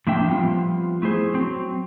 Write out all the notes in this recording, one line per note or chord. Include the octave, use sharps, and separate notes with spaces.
A2 F3 A#3 D4 E5 G5
F3 G3 B3 C4 F4
A3 E4 G#4 C5
F#3 C4